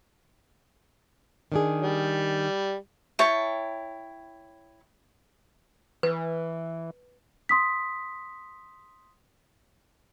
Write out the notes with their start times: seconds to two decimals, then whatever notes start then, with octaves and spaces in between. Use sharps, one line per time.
1.52 D#3 D4 G#4
1.82 G3
3.19 E4 C#5 G5 A5
6.03 E3 B4
7.49 C6 D#6 B6